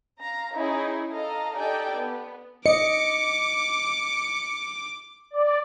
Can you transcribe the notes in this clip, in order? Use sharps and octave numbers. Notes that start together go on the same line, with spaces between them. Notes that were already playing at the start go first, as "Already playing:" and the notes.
F5 A#5
C#4 D#4 E4 G#4
A4 D#5 F5 A#5
D#4 G4 A4 D5 G5 G#5
B3
D#5 D6 C#7
D5